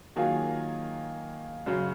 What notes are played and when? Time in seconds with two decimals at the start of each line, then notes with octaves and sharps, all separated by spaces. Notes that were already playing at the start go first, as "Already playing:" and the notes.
0.16 D#3 F#3 A#3 F4 G#4
1.66 F#2 C#3 F#3